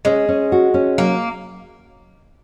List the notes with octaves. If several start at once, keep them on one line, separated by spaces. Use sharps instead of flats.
G#3 C#4
C#4
F#4
C#4
F#3 A#3